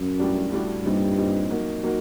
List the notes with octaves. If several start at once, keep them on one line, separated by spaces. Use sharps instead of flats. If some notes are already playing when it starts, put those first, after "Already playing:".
Already playing: F#2
A2 G3 D4 F#4
A2 G3 D4 F#4
G2 A#2 G3 C4 D#4
A#2 G3 C4 D#4
F#3 A#3 D#4 F#4
F#3 A#3 D#4 F#4